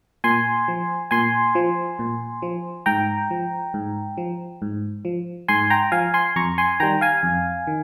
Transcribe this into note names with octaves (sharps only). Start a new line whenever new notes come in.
A#2 G#5 C6
F3
A#2 G#5 C6
F3
A#2
F3
G#2 G5 A#5
F3
G#2
F3
G#2
F3
G#2 G#5 C6
G5 A#5
F3 F5 G#5
G#5 C6
F2 A#5 C#6
G#5 C6
D#3 G3 G5 A#5
F5 G#5
F2
D#3